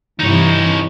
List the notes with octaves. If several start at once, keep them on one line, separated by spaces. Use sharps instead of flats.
G2 C3 E3 D#4 C#5